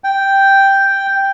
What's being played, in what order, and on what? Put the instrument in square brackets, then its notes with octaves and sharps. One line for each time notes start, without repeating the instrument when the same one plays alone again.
[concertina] G5